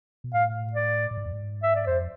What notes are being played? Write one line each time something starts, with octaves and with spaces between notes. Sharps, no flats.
B2
A2 F5
D5
A2
G#2
F2
G#2
E5
D5
F2 C5